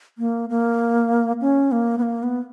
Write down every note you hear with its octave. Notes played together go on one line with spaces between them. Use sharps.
A#3
A#3
C#4
A#3
B3
A#3
B3